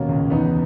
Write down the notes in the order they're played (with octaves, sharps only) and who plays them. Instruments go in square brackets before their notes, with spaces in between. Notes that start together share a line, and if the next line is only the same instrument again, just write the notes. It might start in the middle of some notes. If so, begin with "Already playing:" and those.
Already playing: [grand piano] D#2 B2 A#3 C#4
C#2
E2 B3 D#4